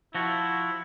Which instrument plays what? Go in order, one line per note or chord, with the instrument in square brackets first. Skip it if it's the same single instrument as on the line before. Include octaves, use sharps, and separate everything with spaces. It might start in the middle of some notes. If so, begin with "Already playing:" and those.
[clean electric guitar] F3 F#4 [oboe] E4